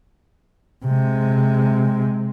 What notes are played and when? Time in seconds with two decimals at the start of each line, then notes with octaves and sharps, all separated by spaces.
0.85 C3 G#3